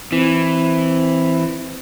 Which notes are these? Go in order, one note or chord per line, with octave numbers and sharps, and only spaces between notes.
E3 C4